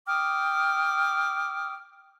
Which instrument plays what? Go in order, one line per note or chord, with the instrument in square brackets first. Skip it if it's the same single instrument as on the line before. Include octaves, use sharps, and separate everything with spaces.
[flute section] G5 D6 D#6 F6